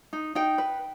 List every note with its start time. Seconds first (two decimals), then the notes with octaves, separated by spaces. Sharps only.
0.13 D#4
0.35 D#4 G5
0.58 B4